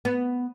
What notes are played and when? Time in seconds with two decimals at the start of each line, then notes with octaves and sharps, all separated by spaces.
0.05 B3